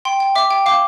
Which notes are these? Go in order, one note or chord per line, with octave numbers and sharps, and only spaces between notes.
G5 C6
G5
E5 D6
G5
F5 D6